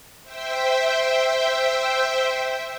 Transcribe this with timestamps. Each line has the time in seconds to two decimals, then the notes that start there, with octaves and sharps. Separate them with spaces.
0.23 C5 E5 G5